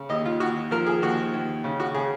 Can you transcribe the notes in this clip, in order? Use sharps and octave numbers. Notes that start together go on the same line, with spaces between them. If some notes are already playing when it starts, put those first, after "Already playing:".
Already playing: C#3
D#2 D#5
F4
D#2 F#4
F3 A#4
G#4
D#2 F#4
D#2
C#3
F#4
C#3 G#4